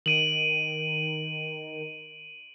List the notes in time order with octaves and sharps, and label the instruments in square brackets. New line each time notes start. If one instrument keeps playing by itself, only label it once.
[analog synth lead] D#3 [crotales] D7 D#7 F#7